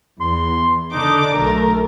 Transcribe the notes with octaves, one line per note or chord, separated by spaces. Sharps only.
E2 C6
D3 D4 D#4 D6
B1 A3 A#4 A#5